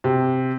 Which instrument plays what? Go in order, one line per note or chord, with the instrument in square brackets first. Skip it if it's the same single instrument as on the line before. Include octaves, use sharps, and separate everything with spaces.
[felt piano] C3